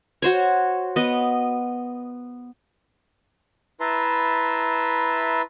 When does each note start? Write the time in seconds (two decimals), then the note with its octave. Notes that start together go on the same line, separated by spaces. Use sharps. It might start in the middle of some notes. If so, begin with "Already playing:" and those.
0.22 F#4 C5 C#5
0.96 B3 D#5
3.80 E4 B4 E5 A5 A#5 C6